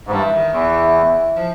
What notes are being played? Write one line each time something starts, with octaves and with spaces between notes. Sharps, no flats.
G#2
G2 E3
D#3
E2 E3
F3